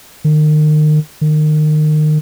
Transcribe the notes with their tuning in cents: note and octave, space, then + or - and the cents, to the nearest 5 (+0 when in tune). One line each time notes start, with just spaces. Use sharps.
D#3 -35
D#3 -30